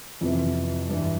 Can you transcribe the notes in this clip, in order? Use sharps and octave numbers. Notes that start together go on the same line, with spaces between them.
F2 C3 E3
G2 E3